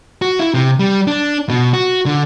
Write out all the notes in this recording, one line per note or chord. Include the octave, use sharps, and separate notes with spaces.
F#4
E4
C3
G3
D4
B2
F#4
D3